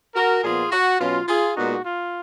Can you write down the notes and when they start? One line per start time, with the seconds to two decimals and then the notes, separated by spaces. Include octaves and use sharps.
0.15 F#4 A#4
0.43 A#2 F3 B3 F4 G#4
0.71 F#4
0.99 B2 F#3 C#4 F4
1.27 F4 G#4
1.56 A#2 G#3 B3 D#4 F#4
1.84 F4